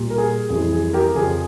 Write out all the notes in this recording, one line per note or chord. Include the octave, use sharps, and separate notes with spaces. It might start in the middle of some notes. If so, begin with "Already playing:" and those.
Already playing: A#2 G3
A#4
G#4
F2 E3 G3 G#4
G#4
G4 A#4
F2 C#3 F3 G#4